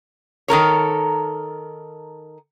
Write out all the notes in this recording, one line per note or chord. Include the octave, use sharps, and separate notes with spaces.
D#3 A4 A#4 C#5